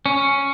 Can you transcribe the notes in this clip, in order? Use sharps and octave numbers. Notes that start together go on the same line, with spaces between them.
C#4